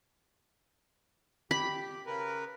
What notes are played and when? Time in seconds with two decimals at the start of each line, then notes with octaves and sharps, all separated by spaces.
1.51 G4 B5
2.06 C#3 A#4 B4